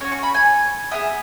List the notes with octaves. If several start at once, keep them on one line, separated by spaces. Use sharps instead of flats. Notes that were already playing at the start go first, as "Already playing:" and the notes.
C#4 F#4 C#5
C#6
B5
G#5
B3 E4 G#4 E5